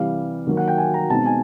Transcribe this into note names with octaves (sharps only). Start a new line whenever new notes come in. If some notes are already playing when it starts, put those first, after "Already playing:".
Already playing: C3 E3 G3 F5
D#3 F#3 A#3
F#5
G5
G#5
A#5
B2 G#3 C4 D#4 A5
G#5